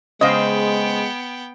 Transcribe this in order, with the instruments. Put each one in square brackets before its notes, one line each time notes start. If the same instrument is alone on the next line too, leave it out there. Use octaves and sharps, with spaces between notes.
[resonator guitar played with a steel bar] C#3 C5 [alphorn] G#3 [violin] B3 G5 [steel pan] D#5 F5